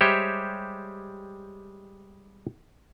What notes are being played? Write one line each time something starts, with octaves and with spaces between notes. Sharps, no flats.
G3 G#3 G4 C5 C#5 E5